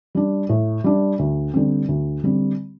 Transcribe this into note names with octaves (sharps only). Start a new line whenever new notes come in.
G3 D4
A2
G3 D4
D2
D3 G3 C4
D2
D3 G3 C4